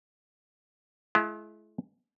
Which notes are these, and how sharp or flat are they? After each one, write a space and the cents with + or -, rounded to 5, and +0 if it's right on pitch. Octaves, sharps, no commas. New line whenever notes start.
G#3 +45 E4 +35